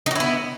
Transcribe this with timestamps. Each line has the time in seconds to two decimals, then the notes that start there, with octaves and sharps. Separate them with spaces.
0.06 D#4
0.11 F#4
0.15 E4
0.20 B3